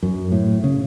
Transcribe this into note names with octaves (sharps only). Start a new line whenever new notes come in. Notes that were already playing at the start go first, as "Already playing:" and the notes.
F#2
A2
C#3